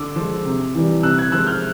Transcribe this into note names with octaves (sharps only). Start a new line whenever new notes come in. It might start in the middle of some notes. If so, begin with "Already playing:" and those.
Already playing: D3 D6 E6
F3 G#3
C3
E3 G3
C3 E6 F#6
F#6 G#6
F3 G#3 E6 F#6
F6 G6